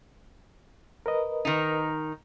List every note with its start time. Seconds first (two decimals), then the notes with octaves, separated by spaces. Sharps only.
1.06 A#4 B4 D#5
1.45 D#3 D#4